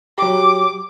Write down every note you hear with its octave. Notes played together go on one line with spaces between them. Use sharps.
F#3 G4 D6